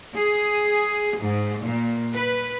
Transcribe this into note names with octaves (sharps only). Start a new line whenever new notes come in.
G#4
G#2
A#2
B4